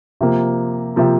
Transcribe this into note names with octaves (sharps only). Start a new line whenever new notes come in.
C3 F3 A#3
C3 F3 A#3